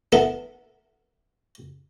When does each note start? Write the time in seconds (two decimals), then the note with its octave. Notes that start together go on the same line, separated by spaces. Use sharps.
0.12 B3 E4 A4 A#4